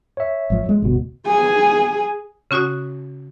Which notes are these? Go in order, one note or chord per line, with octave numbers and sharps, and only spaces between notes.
C#5 E5
G#1 F3
F2 G#3
G1 D2 B2
G#4 G#5
C#3 C#4 F#4 D#6 F#6